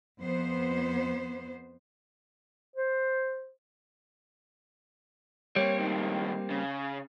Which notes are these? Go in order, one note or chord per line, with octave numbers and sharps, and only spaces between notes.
F2 B3 C5
C5
G3 A#3 C4 C#5
C#2 D#3
C#3